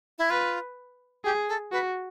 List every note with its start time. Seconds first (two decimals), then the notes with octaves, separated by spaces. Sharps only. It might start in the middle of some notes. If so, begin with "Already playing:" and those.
0.18 E4
0.30 F4 B4
1.24 G4 G#4
1.49 A4
1.72 F#4 B4